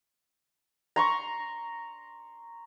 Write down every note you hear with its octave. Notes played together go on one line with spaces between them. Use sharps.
A#5 C6 C#6